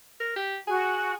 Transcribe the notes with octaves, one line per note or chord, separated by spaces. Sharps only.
A#4
G4
F#4 G#4